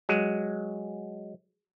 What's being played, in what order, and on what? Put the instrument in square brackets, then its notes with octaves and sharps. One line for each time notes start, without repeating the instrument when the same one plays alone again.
[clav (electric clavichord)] F#3 G#3